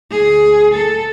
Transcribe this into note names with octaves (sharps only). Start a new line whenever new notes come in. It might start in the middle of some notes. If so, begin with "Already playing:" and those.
D2 G#4
A4